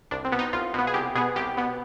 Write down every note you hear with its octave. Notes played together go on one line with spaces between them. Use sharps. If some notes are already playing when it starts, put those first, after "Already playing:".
C2 D4
C4
B2 B3
D#4
C2 F4
B2 B3
G#4
C2 G4
B2 B3 G#4
C2 G4
B2 B3